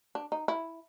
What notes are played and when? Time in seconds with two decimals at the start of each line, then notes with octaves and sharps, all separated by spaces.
0.15 D4
0.32 D#4
0.48 E4